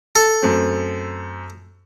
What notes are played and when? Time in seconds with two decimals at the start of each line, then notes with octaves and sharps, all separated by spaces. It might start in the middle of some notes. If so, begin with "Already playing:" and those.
0.16 A4
0.42 F#2 A3 C4